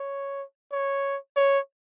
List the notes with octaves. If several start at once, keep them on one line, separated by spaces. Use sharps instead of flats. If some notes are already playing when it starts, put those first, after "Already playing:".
Already playing: C#5
C#5
C#5